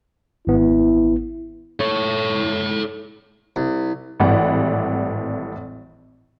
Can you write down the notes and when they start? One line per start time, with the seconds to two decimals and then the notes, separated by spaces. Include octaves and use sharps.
0.47 G#1 B3 E4
1.80 A4 C#5
3.56 C2
4.20 G#1 A2 E3 G3 F#5 B5